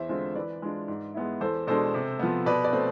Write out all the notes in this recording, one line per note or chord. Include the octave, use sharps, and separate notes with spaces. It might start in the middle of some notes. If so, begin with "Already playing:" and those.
Already playing: E2 C5 E5
D3 G#3 C4 F4
E3 B4 D5
G#3 D4 F4
G#2
G#3 B3 E4
E2 A4 C5
B2 G#3 D4 A4 C5
C3
F3 B3
B2 B4 D5
B4 D5
A3 C4